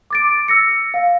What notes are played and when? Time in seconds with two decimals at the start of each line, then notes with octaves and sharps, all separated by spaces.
0.11 D6 A6 D7
0.48 E6 A#6 C#7
0.94 F5